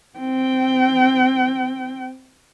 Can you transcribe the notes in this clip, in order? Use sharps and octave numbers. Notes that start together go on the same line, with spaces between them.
C4 G5